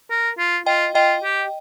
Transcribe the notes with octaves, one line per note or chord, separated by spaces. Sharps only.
A#4
F4
F4 D#5 G5
F4 D#5 G5
G4